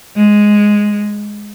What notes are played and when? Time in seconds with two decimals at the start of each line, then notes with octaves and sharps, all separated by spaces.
0.16 G#3